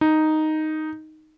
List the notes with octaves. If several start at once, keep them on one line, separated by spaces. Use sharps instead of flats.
D#4